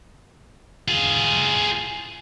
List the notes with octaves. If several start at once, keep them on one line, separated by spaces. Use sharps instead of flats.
F4 G#4